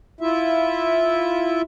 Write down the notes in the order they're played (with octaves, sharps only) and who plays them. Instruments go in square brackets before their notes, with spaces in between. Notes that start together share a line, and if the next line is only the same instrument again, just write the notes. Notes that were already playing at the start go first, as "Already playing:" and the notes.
[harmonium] E4 F4 E5